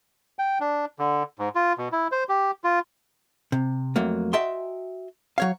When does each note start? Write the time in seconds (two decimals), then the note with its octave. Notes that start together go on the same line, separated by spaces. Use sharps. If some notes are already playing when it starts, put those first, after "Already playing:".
0.39 G5
0.60 D4
0.99 D3
1.39 G#2
1.55 F4
1.78 B2
1.92 E4
2.12 C5
2.29 G4
2.64 F4
3.52 C3
3.96 F2 F#3 A3 A#3
4.33 F#4 D#5 E5 G5 A5 C6
5.38 F#3 C#5 F5